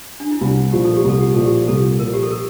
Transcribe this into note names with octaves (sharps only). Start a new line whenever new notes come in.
D4
E4
C2 F4
A#2 F3 G4
A4
G4
C2
A4
G4
A#2 F3 A4
G4
C2 A4
A#2 F3 A#4
G4
A4
A#4